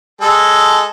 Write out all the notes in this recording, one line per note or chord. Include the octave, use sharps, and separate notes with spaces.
G#3 A4